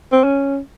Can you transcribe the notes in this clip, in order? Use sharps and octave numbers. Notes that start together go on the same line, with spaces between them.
C4
C#4